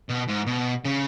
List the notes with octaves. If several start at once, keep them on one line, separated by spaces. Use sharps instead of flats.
B2
G#2
B2
C#3